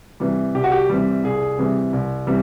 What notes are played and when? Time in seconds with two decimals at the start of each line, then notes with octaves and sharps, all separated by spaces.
0.20 C3 E3 G3
0.55 C2 G4
0.64 F#4
0.72 G4
0.89 C3 E3 G3
1.24 C2 G#4
1.58 C3 E3 G3
1.93 C2
2.27 C3 E3 G3